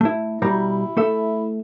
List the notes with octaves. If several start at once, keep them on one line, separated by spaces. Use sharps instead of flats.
A3 E4
B2 G3 E4 A#5
A3 A4 E5